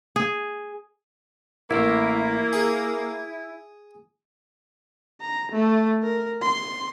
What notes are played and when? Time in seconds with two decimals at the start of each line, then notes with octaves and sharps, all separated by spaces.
0.16 G#4
1.71 A1 A#3 E4
2.53 G#4
5.21 A#5
5.52 A3
6.03 A#4
6.42 C6